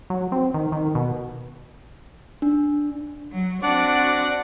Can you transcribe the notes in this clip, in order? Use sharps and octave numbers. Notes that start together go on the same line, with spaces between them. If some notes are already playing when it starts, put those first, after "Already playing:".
F#3
C4
D#3
D#3
B2
D4
F#3
C4 D4 F#4 D5 F#5